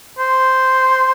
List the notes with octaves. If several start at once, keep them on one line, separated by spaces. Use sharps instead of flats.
C5